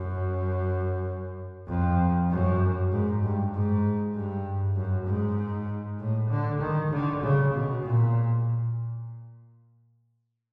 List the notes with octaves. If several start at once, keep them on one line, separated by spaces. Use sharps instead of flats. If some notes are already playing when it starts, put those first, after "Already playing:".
Already playing: F#2
F2
F#2
G#2
G2
G#2
G2
F#2
G#2
A2
D3
D#3
D3
C#3
B2
A#2